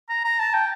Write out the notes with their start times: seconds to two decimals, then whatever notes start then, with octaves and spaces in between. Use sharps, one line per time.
0.09 A#5
0.24 A#5
0.39 A5
0.54 G5